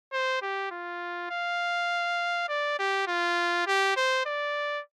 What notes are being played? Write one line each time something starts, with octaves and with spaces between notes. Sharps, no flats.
C5
G4
F4
F5
D5
G4
F4
G4
C5
D5